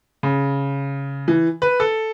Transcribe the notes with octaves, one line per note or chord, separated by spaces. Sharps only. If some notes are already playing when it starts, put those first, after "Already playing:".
C#3
E3
B4
A4